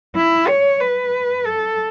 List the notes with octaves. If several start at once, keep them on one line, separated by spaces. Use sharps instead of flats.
E4
C#5
B4
A4